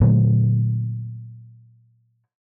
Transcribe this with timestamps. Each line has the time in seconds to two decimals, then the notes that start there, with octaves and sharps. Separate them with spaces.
0.01 A#2 D3 F#3 A3